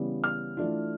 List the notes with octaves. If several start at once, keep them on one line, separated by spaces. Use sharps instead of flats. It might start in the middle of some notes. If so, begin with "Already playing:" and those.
Already playing: C#3 E3 G3 B3
F6
E3 A3 D4 F4